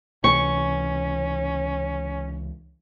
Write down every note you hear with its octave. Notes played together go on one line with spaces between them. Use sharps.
C#2 C3 E3 C#4 C#6